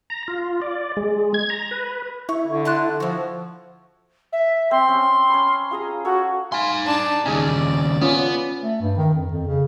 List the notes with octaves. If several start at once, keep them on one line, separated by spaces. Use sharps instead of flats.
A#5
F4
D5
G#3
G#6
A#5
B4
E4 C#6
D3
A5 C6 F#6
F3 E4 F#4
E5
C4 C6
C4 C#4
C#4 B5
F4 G#4 A#5
F#4 A4 C#5
D#4 F5 G#5 B5 C6
D4 A5
D#2 C#3 G#4 D5 D#5 G#5
B3 C#4 F4
A3
G2
D#3
F2
F2
C#3